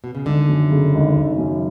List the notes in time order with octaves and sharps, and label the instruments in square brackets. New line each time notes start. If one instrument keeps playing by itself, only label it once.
[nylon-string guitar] B2
C#3
[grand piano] G#1 [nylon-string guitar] D3
[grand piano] F#2
C#3
G#1
G#1
F#2